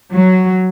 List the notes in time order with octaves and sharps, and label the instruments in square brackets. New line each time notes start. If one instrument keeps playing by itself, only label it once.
[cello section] F#3